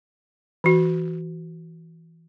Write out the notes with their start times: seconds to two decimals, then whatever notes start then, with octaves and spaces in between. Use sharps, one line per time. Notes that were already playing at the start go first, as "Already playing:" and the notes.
0.64 E3 F#4